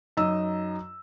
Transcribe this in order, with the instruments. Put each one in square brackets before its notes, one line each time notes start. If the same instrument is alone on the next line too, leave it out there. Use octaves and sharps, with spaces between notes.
[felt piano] F#2 D#4 D#5 E6